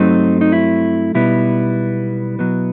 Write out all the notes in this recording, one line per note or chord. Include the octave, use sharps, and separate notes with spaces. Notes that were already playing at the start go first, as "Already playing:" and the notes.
Already playing: G2 F#3 A3 C4 D#4
D#4
E4
B1 B2 G3 B3 E4
B2 F#3 B3